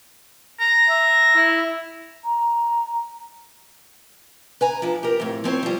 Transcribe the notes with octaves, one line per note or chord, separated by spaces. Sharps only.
A#5
E5
E4
A#5
B4 G#5 A#5
F3 D4
G4 A#4
F2 A2
F3 C4 B4 C#5
F3 G3